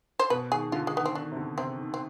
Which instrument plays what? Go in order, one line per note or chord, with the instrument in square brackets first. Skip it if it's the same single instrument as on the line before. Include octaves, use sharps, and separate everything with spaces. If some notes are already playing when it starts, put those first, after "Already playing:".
[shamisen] C5
[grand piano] B2 [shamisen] B4
[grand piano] D#3 [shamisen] G#4
[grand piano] D3 [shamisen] F4
[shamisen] G#3
[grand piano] D#3 [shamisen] B3
[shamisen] C4
[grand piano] D#3 [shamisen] D4
[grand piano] C3
D3
[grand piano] C3 [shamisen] C4
[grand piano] D#3
[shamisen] C4